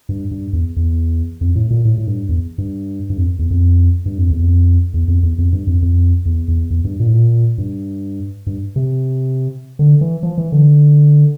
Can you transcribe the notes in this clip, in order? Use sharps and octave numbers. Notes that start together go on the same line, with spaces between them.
G2
G2
E2
E2
F2
A2
A#2
A2
A2
G2
E2
G2
G2
F2
E2
F2
G2
F2
E2
F2
E2
F2
E2
F2
G2
F2
F2
E2
E2
E2
G2
A#2
A2
A#2
G2
G2
C3
D3
E3
F3
E3
D3